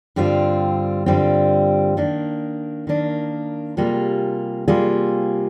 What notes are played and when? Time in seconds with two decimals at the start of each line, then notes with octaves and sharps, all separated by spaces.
0.16 G2 D3 G3 C4 F4
1.06 G2 D3 G3 C4 F4
1.97 D#3 A#3 D4
2.87 D#3 A#3 D4
3.77 C3 G3 A#3 F4 G#4
4.68 C3 G3 A#3 F4 G#4